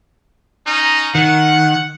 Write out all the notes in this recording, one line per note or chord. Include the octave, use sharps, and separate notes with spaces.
C#4 D#4
D#3 F#5